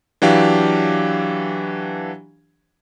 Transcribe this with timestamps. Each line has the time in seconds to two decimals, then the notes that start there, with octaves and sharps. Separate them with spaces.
0.22 E3 F#3 D4 G4 F5